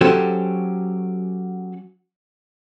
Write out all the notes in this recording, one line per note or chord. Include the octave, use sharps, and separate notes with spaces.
F#3 C#4 F#4 G4 A4 C5